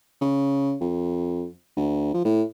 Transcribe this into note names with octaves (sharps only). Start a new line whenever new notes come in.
C#3
F2
D2
F3
A2